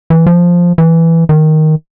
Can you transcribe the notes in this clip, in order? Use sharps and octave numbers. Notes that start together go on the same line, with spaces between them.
E3
F3
E3
D#3